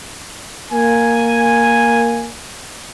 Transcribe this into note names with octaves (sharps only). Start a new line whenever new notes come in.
A#3 G#5